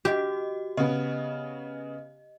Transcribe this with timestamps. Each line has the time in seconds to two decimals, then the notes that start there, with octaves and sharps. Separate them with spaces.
0.05 F#4 G4 D#5
0.77 C#3 B3 D#5